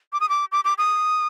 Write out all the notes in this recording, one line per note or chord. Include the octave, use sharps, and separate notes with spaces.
D6
D#6
D6
D6
D6
D#6